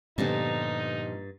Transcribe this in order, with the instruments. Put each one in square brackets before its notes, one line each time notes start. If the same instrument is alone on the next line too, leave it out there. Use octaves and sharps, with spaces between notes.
[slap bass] G2 [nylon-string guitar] A#2 F3 G3 [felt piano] D3 B3 [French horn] D#4